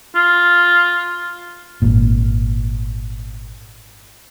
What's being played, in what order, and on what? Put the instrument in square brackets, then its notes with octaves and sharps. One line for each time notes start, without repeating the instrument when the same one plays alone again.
[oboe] F4
[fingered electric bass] G#1 A#2